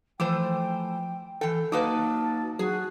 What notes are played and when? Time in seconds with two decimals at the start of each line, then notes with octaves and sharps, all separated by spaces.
0.20 E3 F3 A3 C5 G5 D6
1.41 E3 A4 G5
1.72 F#3 A#3 D#4 B4 A5 D6 D#6
2.59 F#3 F#4 G#4